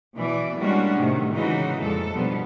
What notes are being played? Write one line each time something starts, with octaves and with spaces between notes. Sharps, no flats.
B2 E3 D5
G3 G#3 A#3 C#4 D4 F#4
A2 C3 D#3
C#3 E3 G#3 D#4 F#4
F2 A#2 G#3 A4
G2 B2 F3 G3 B3